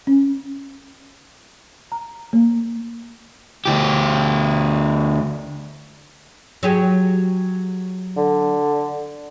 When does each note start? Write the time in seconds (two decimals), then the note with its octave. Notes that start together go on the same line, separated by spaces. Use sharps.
0.07 C#4
1.92 A#5
2.33 A#3
3.65 D2 G4
6.63 F#3 G4 G#4
8.17 D3